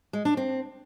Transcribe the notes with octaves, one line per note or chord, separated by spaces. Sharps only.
G#3
D4
C4